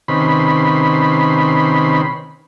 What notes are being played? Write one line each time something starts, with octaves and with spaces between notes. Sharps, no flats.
C3 D#3 C#4 B4 B5 C6